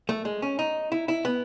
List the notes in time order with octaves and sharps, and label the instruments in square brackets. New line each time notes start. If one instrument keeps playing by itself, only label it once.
[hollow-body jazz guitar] A3
G#3
C#4
D#4
E4
E4
B3